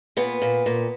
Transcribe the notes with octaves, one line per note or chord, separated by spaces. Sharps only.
A#2 B3
A#2
A#2